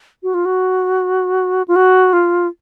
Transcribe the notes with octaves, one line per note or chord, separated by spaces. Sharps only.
F#4
F4
F#4
F4
F#4
F4